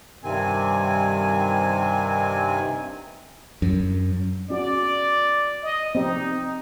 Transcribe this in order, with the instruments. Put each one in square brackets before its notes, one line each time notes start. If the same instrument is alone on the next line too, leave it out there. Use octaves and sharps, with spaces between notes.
[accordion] G2 C3 D#3 C4 G#5
[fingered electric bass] F#2
[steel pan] C#4 F#4 [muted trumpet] D5
[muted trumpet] D#5
[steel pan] C4 G4 [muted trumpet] D#4